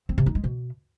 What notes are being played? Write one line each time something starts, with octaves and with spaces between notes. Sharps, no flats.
C4
C3
D#4
G#3
B2